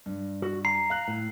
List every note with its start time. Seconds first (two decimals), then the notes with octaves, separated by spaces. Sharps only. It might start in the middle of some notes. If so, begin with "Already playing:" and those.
0.06 G2
0.42 F#4
0.65 A#5 C7
0.90 F5 F#6
1.08 A2